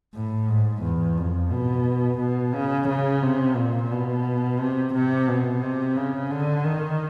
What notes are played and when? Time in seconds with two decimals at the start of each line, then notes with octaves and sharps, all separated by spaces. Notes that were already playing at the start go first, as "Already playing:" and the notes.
0.15 A2
0.49 G#2
0.83 E2
1.18 F2
1.53 B2
2.20 B2
2.55 C#3
2.89 C#3
3.23 C3
3.57 A#2
3.91 B2
4.60 C3
4.94 C3
5.28 B2
5.63 C3
5.97 C#3
6.31 D3
6.64 D#3